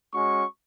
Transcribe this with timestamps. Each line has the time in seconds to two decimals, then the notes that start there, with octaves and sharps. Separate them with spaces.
0.14 G#3 C#4 F#4 C#6